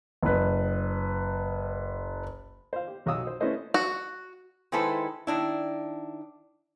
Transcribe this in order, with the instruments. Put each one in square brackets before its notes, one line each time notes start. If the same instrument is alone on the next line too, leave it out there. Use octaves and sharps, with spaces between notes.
[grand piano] F#1 B4
[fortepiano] C5 F5
G4
B1 F#3 F5 D#6 E6
C5
A3 C#4 E4 B4 C5 D#5
[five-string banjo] F#4
[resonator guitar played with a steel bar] D#3 G#3 E4 A4 B4 C5
D#3 D4 E4